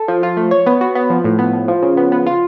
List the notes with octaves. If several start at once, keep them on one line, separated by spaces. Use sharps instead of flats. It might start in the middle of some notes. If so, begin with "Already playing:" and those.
Already playing: A4
F3
F4
A3
C#5
B3
F#4
B3
F3
A2
B3
A2
F3
C#3
B3
B3
F4